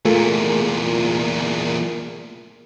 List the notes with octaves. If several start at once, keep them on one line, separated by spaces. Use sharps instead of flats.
E2 A#2 A3 F4 G#4 A#4